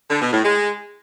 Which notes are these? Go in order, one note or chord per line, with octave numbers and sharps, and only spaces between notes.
D3
B2
A2
G#3